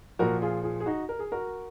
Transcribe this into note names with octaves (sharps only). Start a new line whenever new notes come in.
A#2 F3 F#4 A#4
F4 G#4
F4 G#4
G#4
D#4 F#4
A#4
G#4
F#4 A#4